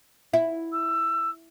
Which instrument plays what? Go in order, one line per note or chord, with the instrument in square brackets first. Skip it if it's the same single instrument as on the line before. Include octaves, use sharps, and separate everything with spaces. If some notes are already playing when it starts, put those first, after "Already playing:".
[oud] E4
[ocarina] E6